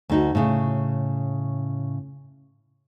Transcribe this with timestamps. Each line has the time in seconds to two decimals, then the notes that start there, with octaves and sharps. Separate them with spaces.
0.09 D2 D#4 F#4
0.35 A2 C#3